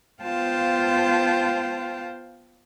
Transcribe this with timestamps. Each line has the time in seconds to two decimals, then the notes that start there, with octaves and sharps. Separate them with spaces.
0.23 B3 F4 C5 F5 G5 A5